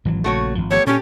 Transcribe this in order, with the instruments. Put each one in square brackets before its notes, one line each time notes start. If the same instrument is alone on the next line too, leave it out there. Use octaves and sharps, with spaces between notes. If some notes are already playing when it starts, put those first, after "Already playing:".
[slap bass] G#1 E3 F#3
[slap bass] A#1 A#2 C#3 [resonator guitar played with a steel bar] A3 F#4 C#5
[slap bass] G#1 F3
[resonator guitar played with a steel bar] A3 B3 G4 [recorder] C#5
[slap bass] A#2 [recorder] C#4 [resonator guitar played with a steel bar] G4 A4